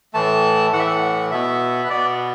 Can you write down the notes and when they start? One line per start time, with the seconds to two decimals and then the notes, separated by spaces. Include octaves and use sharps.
0.14 A2 E3 A3 A5
0.72 A2 E3 A3 F#5
0.79 E5
0.86 F#5
1.31 B2 B3 E5
1.84 B4
1.89 B2 B3 D5